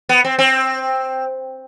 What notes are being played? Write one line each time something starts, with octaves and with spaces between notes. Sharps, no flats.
B3
C4
C4